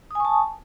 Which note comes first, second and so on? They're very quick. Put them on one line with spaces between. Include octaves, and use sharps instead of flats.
D#6 G#5 C#6 A5